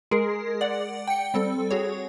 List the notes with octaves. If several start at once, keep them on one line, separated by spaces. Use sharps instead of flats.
G#3 G#4 A#4
D5 F#5
G5 C#7
G3 C4 A4
F#4 G#4 C#5